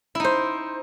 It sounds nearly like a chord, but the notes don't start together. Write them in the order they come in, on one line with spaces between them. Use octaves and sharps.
E4 D#4 C5